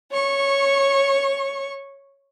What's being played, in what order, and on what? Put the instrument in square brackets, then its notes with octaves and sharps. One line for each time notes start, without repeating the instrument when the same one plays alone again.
[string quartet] C#5 C#6